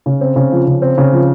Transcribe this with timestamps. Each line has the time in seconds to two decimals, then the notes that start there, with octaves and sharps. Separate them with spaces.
0.06 C#3
0.21 C4
0.36 C#3
0.52 F3
0.67 C#3
0.82 C4
0.98 C#3
1.12 F3